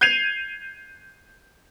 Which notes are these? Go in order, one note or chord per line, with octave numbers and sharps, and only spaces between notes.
G6 G#6 C7 D#7 F7